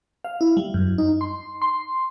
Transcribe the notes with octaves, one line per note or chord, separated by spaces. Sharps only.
F5
E4
G3
F#2
D#4
C6
C6